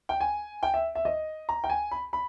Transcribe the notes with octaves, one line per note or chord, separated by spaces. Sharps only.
G5
G#5
G5
E5
E5
D#5
A#5
G5
G#5
B5
B5